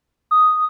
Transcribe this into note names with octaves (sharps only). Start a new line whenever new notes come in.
D#6